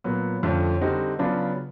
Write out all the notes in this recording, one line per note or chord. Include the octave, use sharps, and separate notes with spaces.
A#2 F#3 B3
F2 D3 F3 A3 C#4
D3 G3 C4 D#4 F#4
C#3 F#3 B3 D4 F4